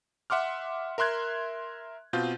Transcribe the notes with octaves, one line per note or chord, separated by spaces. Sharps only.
E5 F#5 C6 D6 F6
A#4 E5 C6 F#6 G#6
B2 C4 F4 G6